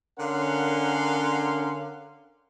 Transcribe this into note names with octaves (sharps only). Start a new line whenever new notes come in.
D3 C#4 A#4 F5 F#5 C6